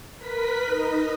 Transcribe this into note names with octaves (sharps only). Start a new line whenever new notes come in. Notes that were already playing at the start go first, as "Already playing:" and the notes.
A#4 B4 B6
D#4 D#5